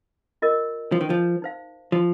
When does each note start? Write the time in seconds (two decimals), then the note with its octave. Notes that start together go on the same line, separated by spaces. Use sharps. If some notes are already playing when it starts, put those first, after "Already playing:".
0.42 F4 A#4 D#5
0.92 F3
1.01 D#3
1.10 F3
1.42 D#4 C5 F5
1.92 F3